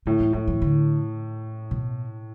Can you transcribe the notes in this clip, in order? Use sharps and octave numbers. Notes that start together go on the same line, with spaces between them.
A2 D3
E3
A2 F3
E3
D3
B2